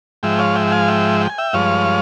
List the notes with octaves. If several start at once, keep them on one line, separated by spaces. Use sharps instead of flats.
G#2 F3 G#3 E5 G5
C#5 F5
E5 G5
G5
F5 G#5
E5 G5
G5
G#5
E5 G5
G2 F3 G#3 C#5 F5